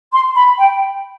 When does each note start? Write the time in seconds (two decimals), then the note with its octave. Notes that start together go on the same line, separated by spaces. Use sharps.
0.13 C6
0.35 B5
0.59 G5